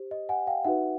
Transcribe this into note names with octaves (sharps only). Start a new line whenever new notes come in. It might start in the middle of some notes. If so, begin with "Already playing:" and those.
Already playing: G4 C5
D#5
F#5 G#5
F5 G5
D#4 F#4 B4 E5 F#5